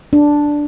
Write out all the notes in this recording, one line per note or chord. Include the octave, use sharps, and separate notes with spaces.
D4